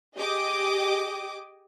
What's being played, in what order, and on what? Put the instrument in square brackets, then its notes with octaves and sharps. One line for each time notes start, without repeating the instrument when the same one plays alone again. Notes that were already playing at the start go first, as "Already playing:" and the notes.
[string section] G4 G#4 D#5 G5 D6 D#6